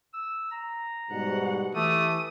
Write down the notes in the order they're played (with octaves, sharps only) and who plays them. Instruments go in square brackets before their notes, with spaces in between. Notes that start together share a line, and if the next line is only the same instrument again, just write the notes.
[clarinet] E6
A#5
[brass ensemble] G#2 B2 G3 [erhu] F#5
[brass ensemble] E3 [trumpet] A3 [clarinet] G4 [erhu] D#6